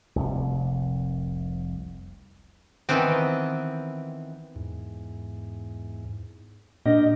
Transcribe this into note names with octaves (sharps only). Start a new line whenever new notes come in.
F1 C2
D#3 E3 B3 C4
E2 G#2
A#2 D4 G4 A#4 D#5